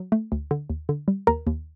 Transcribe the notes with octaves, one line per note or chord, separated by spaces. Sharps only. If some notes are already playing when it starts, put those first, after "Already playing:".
Already playing: F#3
A3
D2
D3
D#2
D3
G3
D#2 A#4 A#5
D#2